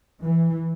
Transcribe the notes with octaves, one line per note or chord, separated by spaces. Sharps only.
E3